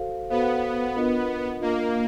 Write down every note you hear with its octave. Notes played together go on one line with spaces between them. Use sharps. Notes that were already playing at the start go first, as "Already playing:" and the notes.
Already playing: F#4 A4 C5 F5
B3 F#4 A4 C5 F5
D4 F4 A#4 D#5
A#3 D4 F4 A#4 D#5